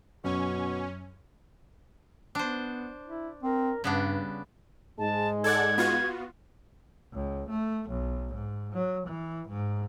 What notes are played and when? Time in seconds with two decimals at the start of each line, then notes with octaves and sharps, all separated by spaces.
0.24 F#2 B2 C#4 C#6
2.35 B3 D4 C5
3.07 E4
3.43 C4 A#4
3.84 G2 C#3 G3 B3 D4
4.98 G#2 G#3 A5
5.44 A4 D5 F#5 G#6
5.78 B3 F4 F#4
7.13 C#2
7.50 A3
7.90 B1
8.34 G#2
8.73 F#3
9.07 E3
9.48 G#2